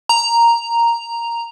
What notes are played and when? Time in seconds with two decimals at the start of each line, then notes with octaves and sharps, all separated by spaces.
0.09 A#5